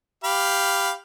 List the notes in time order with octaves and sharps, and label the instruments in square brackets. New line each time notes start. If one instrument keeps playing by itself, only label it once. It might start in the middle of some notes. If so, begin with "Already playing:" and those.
[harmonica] G4 F5 B5